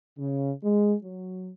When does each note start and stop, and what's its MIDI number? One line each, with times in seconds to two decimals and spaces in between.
0.19 0.51 49
0.64 0.95 56
1.03 1.52 54